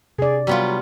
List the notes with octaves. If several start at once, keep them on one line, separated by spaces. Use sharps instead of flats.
C3 G#4 D5
F#3 G3 B3 F4